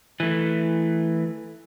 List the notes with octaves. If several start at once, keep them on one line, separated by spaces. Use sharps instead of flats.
E3 A3